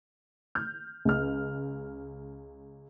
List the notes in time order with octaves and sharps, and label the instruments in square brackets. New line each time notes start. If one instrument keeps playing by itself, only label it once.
[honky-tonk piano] F6 G6
C#2 F6